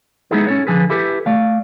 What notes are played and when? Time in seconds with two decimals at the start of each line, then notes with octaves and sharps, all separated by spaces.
0.31 G#3 B3 D#4 E4 G#4 A4
0.47 C#4 A4 C#5
0.67 D3 F3 G#4 A4 B4
0.90 E4 G4 A4 B4
1.26 A3 D5 F5